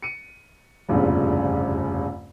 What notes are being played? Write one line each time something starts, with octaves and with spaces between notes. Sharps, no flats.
C#7 D#7
F1 A#1 E2 G2 C#3 F4